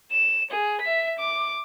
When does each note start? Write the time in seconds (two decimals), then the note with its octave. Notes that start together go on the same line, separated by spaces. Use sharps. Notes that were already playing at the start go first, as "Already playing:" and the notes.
0.12 E7
0.51 G#4
0.81 E5 B6
1.19 D6